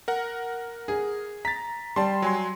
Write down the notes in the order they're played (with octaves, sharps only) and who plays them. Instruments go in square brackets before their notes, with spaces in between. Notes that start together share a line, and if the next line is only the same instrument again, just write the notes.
[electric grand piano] A#4 F#5
[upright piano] G#4
[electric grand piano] A#5 A6 [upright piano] B6
[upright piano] G3 [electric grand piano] A5 C6
[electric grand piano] F#3 G#5 C6